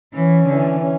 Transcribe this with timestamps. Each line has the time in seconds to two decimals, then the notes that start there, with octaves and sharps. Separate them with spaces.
0.14 E3 C#4
0.47 D3 E3
0.80 C#4